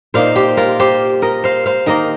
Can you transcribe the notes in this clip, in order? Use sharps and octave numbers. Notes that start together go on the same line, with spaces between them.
A#2 A#3 D#4 C5 F5
G4 C5
F4 A#4
G4 C5
A#4 D#5
C5 F5
C5 F5
D#3 A#3 D#4 A#4 D#5